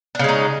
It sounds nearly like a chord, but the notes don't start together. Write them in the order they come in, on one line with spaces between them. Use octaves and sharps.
D4 C#3 G#3 D#4